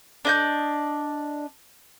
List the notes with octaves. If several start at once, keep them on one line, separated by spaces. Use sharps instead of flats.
D4 D#5 G6